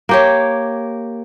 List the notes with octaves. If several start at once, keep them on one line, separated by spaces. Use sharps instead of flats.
A#3 G4 C#5